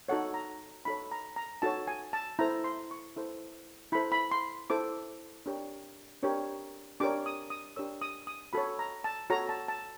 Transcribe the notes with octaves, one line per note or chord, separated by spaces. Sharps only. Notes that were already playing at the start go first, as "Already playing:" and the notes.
D#4 F#4 A4 C#5 F#5
A#5
D#4 F#4 A4 C#5 B5
A#5
A#5
D#4 F#4 A4 C#5 A5
G#5
A5
E4 A4 C5 A#5
C6
C#6
E4 A4 C5
E4 A4 C5 B5
B5
C6
E4 A4 C5 D6
D4 G4 A#4 C#5
D4 G4 A#4 C#5
D4 G4 A#4 C#5 D6
D#6
D#6
D4 G4 A#4 C#5 E6
D#6
D#6
F#4 A4 C#5 B5
A#5
A5
F#4 A4 C#5 A#5
A5
A5